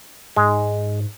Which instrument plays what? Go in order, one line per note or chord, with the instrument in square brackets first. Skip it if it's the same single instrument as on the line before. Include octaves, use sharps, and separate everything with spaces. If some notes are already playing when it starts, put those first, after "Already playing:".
[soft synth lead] G#2 [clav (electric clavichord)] G#3